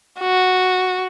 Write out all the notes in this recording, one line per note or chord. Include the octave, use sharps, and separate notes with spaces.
F#4